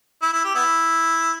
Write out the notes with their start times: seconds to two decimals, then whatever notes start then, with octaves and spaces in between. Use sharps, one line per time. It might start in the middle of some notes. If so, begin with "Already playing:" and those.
0.22 E4
0.33 E4
0.44 G4
0.55 B3 E4